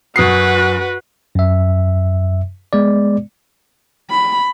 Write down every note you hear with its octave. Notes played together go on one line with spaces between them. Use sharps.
F#2 F#4 B4 D#6 C7
F#2 E5
G#3 B3 D5
B5